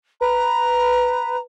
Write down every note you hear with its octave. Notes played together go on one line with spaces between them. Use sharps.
B4 A#5